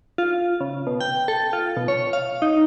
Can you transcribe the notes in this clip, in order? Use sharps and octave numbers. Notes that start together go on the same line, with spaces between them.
F4
C#3
B2
G5
A4
F4
B2
C#5
F5
D#4